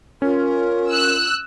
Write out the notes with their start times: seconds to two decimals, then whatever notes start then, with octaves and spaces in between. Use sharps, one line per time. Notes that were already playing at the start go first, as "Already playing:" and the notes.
0.22 C#4 F4 A#4
0.90 E6 F#6